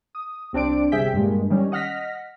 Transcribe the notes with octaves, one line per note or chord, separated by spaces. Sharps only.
D#6
C2 C4 D4 D5 D7
G1 C3 G#4 E5 G5 B6
G2 A#2 G#3
D#3 G3 C#4
D#5 F#5 F6 A#6 B6